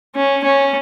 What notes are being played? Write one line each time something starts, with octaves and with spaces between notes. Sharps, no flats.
C#4
C#4